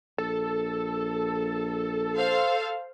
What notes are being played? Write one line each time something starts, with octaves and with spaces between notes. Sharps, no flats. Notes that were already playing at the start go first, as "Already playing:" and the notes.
A#1 A4
C5 F5